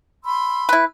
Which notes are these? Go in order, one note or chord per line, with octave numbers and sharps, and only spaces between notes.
B5 C6 E6
E4 B4